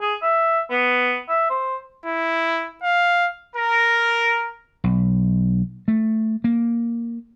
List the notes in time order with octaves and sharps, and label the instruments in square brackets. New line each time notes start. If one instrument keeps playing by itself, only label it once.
[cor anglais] G#4
E5
B3
E5
C5
[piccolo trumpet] E4
F5
[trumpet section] A#4
[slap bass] B1
A3
A#3